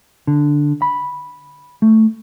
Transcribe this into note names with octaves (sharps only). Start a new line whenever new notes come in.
D3
B5
A3